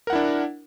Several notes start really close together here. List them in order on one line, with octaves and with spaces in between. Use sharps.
A#4 F#5 E4 D4